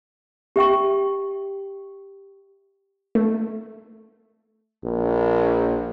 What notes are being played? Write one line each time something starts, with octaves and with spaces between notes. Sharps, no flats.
G4 E5 G5 C#6
A3
A#1